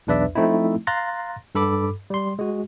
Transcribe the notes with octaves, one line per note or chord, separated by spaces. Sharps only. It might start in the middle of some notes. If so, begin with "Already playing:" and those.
B1 E2 D4 B4 D5 E5
F3 A3 C4 D#4 E4
F5 A#5 C6 F#6 A6 A#6
G2 A4 B5 D6
G3 C6
G#3 F#4